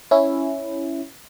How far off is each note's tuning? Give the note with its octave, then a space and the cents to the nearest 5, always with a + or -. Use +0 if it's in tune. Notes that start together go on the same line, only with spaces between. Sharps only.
C#4 +0 E4 +0